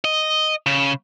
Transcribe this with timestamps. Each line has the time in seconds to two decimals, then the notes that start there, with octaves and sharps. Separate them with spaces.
0.04 D#5
0.66 C#3